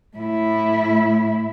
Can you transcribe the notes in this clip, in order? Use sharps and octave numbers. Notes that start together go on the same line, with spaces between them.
A2 E4